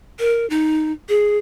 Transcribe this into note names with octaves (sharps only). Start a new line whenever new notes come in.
A#4
D#4
G#4